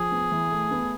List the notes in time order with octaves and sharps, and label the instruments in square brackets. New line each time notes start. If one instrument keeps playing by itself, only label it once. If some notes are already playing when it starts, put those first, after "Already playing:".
Already playing: [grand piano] F3 [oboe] G#4
[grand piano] B3
E3
A3
B3